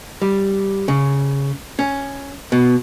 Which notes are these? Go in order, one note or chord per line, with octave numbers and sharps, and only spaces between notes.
G3
C#3
C#4
B2